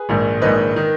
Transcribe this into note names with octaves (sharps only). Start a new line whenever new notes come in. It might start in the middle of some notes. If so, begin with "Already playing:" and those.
Already playing: G#4 B4
A#1 G#2 D#3
A#1 G#2 D#3 B4 D#5
D#3